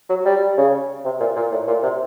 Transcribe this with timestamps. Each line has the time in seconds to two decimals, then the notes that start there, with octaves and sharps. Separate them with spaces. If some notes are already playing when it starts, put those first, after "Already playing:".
0.09 F#3
0.25 G3
0.57 C#3
1.05 C3
1.20 A#2
1.36 A#2
1.52 A2
1.68 A#2
1.83 C3